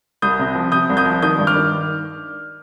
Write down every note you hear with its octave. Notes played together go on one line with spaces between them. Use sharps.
C2 D#6 G6
C3
F3
C3 D#6 G6
C2
D#6 G6
F3
D#3 D#6 G6
G2
D6 F6
D#3